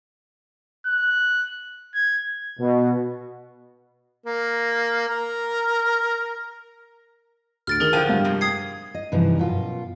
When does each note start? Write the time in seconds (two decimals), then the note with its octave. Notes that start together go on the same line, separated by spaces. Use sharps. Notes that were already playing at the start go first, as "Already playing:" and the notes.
0.87 F#6
1.94 G#6
2.59 B2
4.26 A#3
5.08 A#4
7.67 D2 F6 A6 D7
7.80 D#3 G#4 A#4 G7
7.93 E2 D3 F3 G5 D#7
8.09 G2 F5
8.24 F2 C3
8.41 D#6 G#6 C7
8.95 D#5
9.12 G2 C3 E3 F3 D#4
9.38 F#2 B2 F4